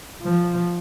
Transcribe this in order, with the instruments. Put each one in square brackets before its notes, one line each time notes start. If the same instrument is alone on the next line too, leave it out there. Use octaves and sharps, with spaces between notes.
[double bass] F3